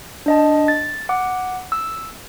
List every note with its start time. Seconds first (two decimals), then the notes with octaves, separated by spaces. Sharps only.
0.26 D4 D#5 A5
0.68 A6
1.09 F#5 D6
1.72 E6